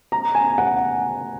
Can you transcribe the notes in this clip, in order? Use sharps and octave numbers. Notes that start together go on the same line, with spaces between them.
A#5
G#5
F#5